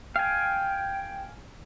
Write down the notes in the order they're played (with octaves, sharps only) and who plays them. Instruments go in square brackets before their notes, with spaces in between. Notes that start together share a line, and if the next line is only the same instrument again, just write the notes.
[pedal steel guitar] F5 G#5 [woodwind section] G5